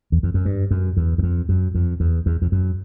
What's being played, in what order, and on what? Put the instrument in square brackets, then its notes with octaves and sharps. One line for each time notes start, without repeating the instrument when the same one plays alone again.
[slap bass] E2
F2
F#2
G2
F#2
E2
E2
F2
F#2
F2
E2
E2
F2
F#2